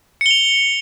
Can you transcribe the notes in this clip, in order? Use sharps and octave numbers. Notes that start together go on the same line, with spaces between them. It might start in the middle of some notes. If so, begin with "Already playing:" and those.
C#7 F7 G7